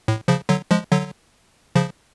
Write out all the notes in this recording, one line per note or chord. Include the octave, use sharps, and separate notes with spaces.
A2
C#3 F3
D3 F#3
F3 G#3
D3 F#3
C#3 F3